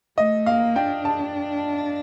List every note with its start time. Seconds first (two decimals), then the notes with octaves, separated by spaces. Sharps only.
0.17 A3 D#5
0.46 A#3 F5
0.76 D4 G5
1.05 A5